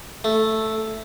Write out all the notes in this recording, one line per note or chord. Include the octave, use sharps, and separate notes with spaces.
A3